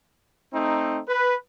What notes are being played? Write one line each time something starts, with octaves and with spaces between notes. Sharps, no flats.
A3 C4 D#4
B4